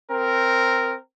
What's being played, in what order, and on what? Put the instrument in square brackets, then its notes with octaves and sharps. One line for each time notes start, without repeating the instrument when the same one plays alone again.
[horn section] C4 A#4